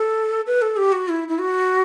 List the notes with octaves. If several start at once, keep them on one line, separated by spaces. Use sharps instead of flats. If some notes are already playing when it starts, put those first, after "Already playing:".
Already playing: A4
B4
A4
G4
F#4
E4
E4
F#4